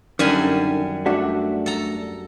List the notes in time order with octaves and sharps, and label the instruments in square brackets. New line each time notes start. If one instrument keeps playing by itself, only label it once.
[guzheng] F#2 G3 G#5 [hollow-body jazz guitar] D3 D#3
[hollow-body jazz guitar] A3 D4 F#4
[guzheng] A4 A#5